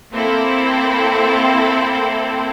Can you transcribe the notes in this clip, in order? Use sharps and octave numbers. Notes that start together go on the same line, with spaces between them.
A#3 C4 E4 A4